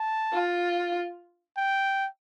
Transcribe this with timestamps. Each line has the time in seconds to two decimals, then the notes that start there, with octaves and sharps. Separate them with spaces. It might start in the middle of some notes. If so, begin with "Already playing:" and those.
Already playing: A5
0.33 F4
1.57 G5